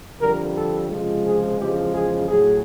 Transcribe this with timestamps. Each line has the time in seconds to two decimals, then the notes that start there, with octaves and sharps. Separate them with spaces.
0.21 F2 D3 G3 A#4
0.55 A4
0.90 C#2 C3 F3 G#3
1.25 G#4
1.59 E2 C#3 F3 G#3 G4
1.94 G#4
2.28 A2 F#3 G#4